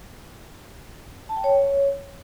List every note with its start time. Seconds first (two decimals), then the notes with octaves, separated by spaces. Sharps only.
1.29 A5
1.37 G5
1.44 C#5